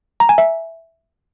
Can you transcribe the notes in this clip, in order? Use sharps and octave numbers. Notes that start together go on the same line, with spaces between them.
A#5
G#5
E5